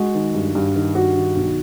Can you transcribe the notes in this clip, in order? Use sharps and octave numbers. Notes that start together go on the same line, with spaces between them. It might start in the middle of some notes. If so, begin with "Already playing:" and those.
Already playing: G#3 F#4
D#3
G2
G2
D#3
G2 F#4
D#3
B1